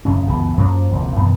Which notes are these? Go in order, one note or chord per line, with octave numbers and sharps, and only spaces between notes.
D1 F#2 C#3 C#4
F#1 C#2 E3 B3
F#2 F3 A#3 C#4
E1 C#2 A#3 C4
F#2 B2 D#3 E3